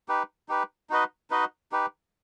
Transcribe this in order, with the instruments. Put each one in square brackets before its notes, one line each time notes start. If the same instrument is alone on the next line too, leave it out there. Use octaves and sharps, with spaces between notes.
[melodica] D#4 G4 B4
D#4 G4 B4
D#4 F#4 B4 D#5
D#4 F#4 B4 D#5
D#4 G4 B4